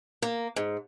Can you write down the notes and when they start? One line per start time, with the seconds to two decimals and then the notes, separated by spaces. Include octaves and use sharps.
0.22 A#3
0.56 G#2